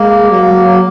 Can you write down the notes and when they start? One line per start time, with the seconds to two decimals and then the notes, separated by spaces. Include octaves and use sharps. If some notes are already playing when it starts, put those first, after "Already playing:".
Already playing: G#3 A#3
0.31 F#3 A#3